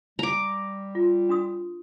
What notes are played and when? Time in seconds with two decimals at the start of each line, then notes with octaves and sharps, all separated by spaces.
0.19 G3 A#5 D6
0.95 F4
1.29 D4 F#4 D#6